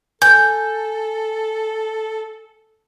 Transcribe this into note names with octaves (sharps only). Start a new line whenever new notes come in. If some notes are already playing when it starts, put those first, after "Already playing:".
A4 G#5 G6